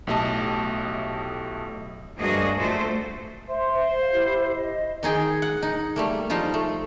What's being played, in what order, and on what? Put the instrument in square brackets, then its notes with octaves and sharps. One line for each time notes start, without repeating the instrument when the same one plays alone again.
[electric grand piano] B1 A2 A3 G4 D#5 A5
[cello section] D2 G2 A#3 F#4 G#4 D#5
A#2 A3 A4 C5
[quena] C5 [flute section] E5 C6
[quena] C5
[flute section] F5
E4 G4
D#5
[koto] D#3 D#4 G#4 G5
F#5
D#4
G3 A3 A#3
F3 G3 D#4 F4
A3